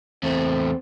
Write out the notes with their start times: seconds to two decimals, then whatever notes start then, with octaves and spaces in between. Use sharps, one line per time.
0.23 E2 A3 C4